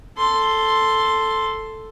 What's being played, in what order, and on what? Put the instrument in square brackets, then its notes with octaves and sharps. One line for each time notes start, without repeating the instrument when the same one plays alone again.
[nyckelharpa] A4 C6